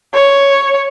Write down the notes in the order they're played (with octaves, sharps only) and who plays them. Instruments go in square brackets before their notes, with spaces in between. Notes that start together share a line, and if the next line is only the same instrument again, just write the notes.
[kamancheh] C#5